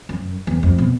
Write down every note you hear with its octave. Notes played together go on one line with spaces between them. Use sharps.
F#2
E2
F2
B2